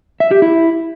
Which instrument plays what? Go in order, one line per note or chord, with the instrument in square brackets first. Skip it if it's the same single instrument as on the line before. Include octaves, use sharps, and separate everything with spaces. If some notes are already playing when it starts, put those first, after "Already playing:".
[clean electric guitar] E5
G4
E4